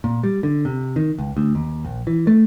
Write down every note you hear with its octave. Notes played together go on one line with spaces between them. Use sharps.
A#2
G3
D3
C3
D#3
C#2
D2
D#2
A#1
E3
A3